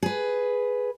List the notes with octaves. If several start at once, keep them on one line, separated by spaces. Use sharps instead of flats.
G#4 B4